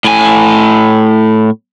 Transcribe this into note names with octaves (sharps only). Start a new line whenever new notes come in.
A2 G#5